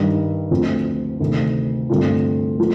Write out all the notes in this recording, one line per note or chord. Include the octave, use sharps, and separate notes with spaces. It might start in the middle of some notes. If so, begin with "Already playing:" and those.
Already playing: G2 D#3 G3
D2 D3 F3 C4 F4
D2 C3 D#3
G2 D3 A3 C4 F4
F3 A3